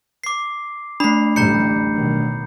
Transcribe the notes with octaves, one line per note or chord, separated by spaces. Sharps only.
D6 C7
A3 D4 B5 C7
A1 D2 G3 A#5 G6 C#7
B2 D#3 F#3